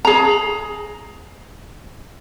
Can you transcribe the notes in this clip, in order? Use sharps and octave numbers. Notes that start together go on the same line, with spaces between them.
G#4 A#5